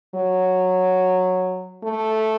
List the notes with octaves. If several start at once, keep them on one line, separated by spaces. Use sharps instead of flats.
F#3
A3